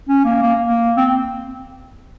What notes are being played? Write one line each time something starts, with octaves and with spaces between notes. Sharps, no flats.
C#4
A#3
A#3
A#3
C4